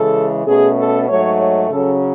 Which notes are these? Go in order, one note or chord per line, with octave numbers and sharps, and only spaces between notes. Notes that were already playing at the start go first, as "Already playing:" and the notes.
Already playing: C#3 E3 G#3 A4
B2 A3 C#4 G#4
A4
G#2 F#3 A3 C#5
C#5
C#3 F#3 C#4 A4